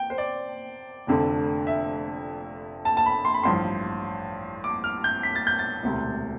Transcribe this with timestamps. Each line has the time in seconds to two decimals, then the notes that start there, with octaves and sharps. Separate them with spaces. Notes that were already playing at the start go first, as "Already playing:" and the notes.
Already playing: G5
0.10 C5
0.18 D5
1.07 F1 F2 D3 A3
1.67 E5
2.85 A5
2.97 A5
3.06 B5
3.25 C6
3.34 B5
3.43 A1 G2 F3 C6
4.64 D6
4.84 F6
5.04 G6
5.23 B6
5.35 A6
5.47 G6
5.59 A6
5.83 E1 D2 C3